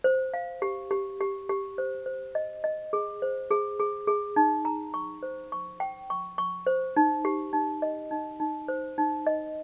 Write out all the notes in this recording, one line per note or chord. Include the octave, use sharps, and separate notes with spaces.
C5
F5
G4
G4
G4
G4
C5
C5
D#5
D#5
G#4
C5
G#4
G#4
G#4
D#4
A#5
C#6
C5
C#6
G5
C#6
C#6
C5
D#4
G4
D#4
D#5
D#4
D#4
C5
D#4
D#5